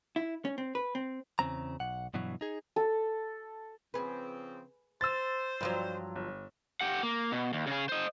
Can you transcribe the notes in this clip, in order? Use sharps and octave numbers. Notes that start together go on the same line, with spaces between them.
E4
C#4
C4
B4
C4
E2 C#3 C4 A#5
B1 F#5
G2 B2 E3 F#3
D#4 G#4
A4
C#3 F3 C4 G#4 B4
C5 E6 A6
G2 F3 F#3
G1
G4 F#5
A#3
B2
D#2
C#3 G#4
C5 D#5